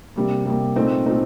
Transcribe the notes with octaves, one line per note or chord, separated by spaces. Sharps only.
C3 G3 A#3
C3 G3 A#3
A#2 A3 C4 D#4
A#2 A3 C4 D#4